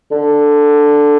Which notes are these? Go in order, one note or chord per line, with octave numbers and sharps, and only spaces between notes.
D3